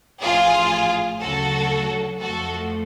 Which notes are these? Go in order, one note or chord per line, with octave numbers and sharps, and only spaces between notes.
A1 A2 F3 F4 G#4
D2 C#3 F#3 F#4 A4
F2 F3 A3 F#4 A4